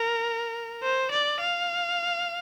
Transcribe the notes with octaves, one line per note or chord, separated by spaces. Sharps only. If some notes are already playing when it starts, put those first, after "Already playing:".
Already playing: A#4
C5
D5
F5